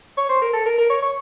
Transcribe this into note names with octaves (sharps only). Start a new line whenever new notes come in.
C#5
C5
A#4
A4
A#4
A#4
C#5
C#5